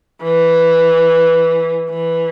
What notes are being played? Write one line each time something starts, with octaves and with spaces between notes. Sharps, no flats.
E3
E3